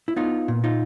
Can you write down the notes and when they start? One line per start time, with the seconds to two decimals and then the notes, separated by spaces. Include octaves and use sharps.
0.08 E4
0.16 B3 D#4 F4
0.48 A#2
0.64 D#4 F4